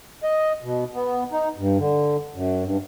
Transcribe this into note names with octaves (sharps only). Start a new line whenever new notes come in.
D#5
B2
B3
D#4
G2
D3
F#2
G2